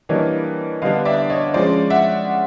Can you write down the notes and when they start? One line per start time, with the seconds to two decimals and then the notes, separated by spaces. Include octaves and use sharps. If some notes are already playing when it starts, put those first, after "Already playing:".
0.09 E3 G3 A#3 D4 C#5 D#5
0.82 D3 G3 B3 D4 D#5 F5
1.05 D5 E5
1.30 C#5 D#5
1.54 F3 G#3 C#4 C5 D5
1.90 E5 F#5